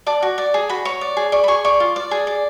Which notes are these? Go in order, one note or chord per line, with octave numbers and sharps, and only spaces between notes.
D5 A5
F#4
D5
G#4
F#4 B5
C#5
D5
G#4
D5 C#6
B5
G#4 C#6
D5 C#6
F4
D5
G#4
D5